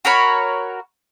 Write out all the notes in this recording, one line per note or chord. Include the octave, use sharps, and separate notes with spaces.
F#4 A#4 C#5 B5